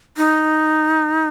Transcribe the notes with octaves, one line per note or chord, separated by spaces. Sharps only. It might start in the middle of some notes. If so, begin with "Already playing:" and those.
D#4